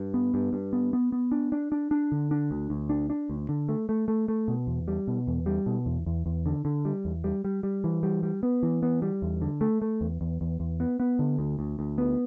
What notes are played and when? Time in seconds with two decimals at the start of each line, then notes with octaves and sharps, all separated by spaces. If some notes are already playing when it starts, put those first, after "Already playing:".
Already playing: G2
0.14 B3
0.34 G2
0.53 G2
0.73 B3
0.93 B3
1.12 B3
1.31 D4
1.52 D4
1.72 D4
1.91 D4
2.12 D3
2.31 D4
2.51 D2
2.70 D2
2.90 D4
3.10 D4
3.30 D2
3.49 D3
3.69 A3
3.89 A3
4.08 A3
4.28 A3
4.48 B2
4.67 E2
4.88 G3
5.08 B2
5.27 E2
5.46 G3
5.66 B2
5.86 E2
6.06 E2
6.26 E2
6.46 D3
6.65 D3
6.85 G3
7.05 E2
7.24 G3
7.45 G3
7.63 G3
7.84 E3
8.03 G3
8.23 G3
8.43 B3
8.63 E3
8.83 B3
9.02 G3
9.22 E2
9.42 D3
9.61 A3
9.82 A3
10.01 E2
10.21 E2
10.41 E2
10.60 E2
10.80 B3
11.00 B3
11.19 D3
11.39 D2
11.59 D2
11.79 D2
11.98 B3